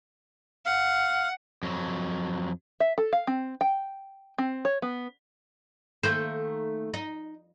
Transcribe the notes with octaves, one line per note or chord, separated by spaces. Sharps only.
F5 F#5
F2 F#3
E5
A4
F5
C4
G5
C4
C#5
B3
D#3 A3 A#3 C5
D#4